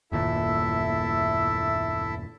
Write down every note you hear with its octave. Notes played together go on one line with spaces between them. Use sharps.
F#1 D#2 A#2 E4 A4 E5